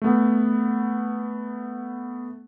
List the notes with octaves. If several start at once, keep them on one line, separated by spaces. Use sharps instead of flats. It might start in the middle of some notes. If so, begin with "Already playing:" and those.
A3 B3